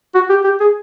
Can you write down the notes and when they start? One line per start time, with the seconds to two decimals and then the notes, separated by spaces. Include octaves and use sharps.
0.14 F#4
0.29 G4
0.44 G4
0.60 G#4